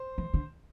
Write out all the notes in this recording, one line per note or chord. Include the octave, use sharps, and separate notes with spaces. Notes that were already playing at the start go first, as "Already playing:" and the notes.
Already playing: C5
E3
D3